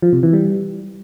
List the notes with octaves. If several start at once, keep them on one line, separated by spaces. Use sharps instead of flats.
F3
C3
E3
G3